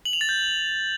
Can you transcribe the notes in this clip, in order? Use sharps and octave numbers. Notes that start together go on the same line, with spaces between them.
F#7
F7
A6
G6